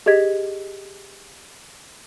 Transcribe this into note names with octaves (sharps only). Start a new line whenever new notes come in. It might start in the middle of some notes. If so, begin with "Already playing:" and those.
G4 G#4 D#5 G#6 B6